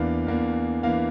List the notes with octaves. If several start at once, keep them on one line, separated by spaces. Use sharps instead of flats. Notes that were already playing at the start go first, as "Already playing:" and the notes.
Already playing: E2 E3 A#3 D4 F5
E2 E3 A#3 D4
E3 A#3 D4 F5